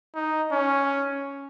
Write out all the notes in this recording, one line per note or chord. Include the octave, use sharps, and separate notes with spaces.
D#4
C#4